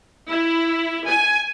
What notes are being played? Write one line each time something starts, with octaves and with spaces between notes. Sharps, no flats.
E4
G#5